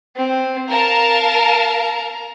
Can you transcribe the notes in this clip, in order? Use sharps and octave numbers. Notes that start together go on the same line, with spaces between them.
C4
A#4 F5 A5 A#5